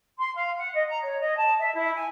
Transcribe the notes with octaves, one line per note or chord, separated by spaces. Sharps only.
C6
F5
F#5
D#5
A#5
C#5
D#5
A5
E5
E4
G#5